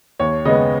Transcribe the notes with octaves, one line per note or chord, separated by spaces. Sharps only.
D#2 C#5
C#3 G#3 B3 D#5